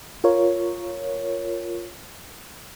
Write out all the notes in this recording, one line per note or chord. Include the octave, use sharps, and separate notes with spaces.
F4 A#4 C#5